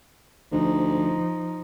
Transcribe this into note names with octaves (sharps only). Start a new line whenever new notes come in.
D2 F3 D#4